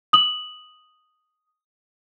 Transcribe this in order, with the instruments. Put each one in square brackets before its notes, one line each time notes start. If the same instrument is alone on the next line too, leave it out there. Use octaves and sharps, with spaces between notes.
[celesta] D#6 F#7